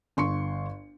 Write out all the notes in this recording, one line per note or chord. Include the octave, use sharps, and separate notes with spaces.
G1 C6 C#6 C#7